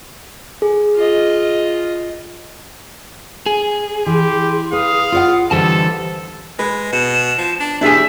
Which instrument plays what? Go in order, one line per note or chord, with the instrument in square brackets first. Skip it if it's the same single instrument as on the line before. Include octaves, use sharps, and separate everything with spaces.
[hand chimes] G#4
[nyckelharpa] F4 D#5
[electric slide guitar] G#4
[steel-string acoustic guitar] E3 [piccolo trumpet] G4 [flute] C6
[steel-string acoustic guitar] B4 [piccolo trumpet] F5 [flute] D#6
[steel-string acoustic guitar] F4 C#5 F#5
[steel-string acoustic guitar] D3 G3 B4 [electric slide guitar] E3 G4 A5 [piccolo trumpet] A4 [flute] C5
[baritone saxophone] G#3 [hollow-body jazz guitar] B4
[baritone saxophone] B2 [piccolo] E7
[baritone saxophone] F3
D4
[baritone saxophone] E2 [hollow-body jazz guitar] D4 G4 G#4 [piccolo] E5